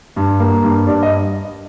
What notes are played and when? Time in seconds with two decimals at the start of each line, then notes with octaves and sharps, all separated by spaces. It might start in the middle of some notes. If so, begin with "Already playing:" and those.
0.16 G2
0.40 A#3
0.63 G2
0.87 G2 D5
1.03 D#5